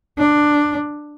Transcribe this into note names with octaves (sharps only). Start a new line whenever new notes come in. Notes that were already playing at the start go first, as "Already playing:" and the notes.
D4